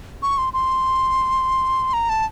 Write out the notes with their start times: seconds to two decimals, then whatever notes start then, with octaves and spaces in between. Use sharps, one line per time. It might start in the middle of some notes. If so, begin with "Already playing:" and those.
0.22 C#6
0.38 C6
0.53 C6
1.93 A#5
2.09 A5